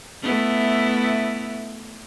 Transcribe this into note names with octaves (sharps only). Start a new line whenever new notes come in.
A3 B3 E4